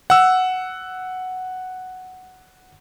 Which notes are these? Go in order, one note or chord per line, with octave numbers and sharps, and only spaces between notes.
F#5 E6